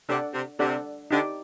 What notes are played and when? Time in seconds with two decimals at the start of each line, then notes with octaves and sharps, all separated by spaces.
0.09 C3 D4 A4 D5 F#5
0.34 C3
0.59 C3 D4 A4 D5 F#5
1.11 D3 D#4 G4 D5 G5